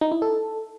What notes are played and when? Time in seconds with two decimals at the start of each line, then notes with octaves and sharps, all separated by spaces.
0.01 D#4
0.12 E4
0.22 A4